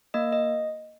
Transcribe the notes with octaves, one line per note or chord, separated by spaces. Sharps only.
A#3 D#5
D#5